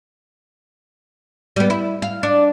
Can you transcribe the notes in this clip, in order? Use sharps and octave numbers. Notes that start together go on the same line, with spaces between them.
G3 B3
E4
F5
D4